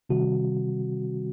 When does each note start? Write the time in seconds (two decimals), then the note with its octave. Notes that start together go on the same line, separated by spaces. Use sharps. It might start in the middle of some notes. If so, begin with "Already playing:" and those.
0.09 C3 D#3 G3 C4 F#4